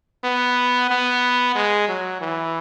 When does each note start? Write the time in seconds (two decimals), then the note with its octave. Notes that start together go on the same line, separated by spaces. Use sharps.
0.24 B3
0.91 B3
1.56 G#3
1.88 F#3
2.21 E3